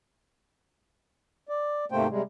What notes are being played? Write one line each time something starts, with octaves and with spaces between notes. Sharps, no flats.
D5
G#2 C3 A3 A#3 C5 G5
C3 G3 G#3